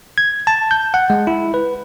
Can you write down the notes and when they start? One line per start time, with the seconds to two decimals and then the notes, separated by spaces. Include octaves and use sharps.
0.18 G#6
0.47 A5
0.71 G6
0.94 F#5
1.10 G#3
1.27 E4
1.54 B4